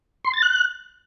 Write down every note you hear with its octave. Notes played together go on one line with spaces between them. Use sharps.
C6
A6
F#6